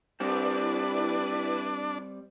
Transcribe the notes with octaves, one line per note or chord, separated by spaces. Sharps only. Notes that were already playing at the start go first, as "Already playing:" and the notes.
G3 C4 D4 E4 B4 D5